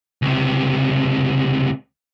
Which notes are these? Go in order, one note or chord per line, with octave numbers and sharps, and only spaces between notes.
C#2 C3